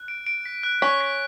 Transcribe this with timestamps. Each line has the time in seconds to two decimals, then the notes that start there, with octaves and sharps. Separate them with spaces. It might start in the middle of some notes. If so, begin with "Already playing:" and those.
Already playing: F#6
0.08 D7
0.27 D7
0.45 B6
0.63 F#6
0.82 C#4 B6
1.01 B6